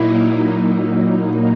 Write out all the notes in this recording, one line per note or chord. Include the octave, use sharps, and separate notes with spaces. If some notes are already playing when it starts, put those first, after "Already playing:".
Already playing: A#2 F#3 A#3 D#4 E4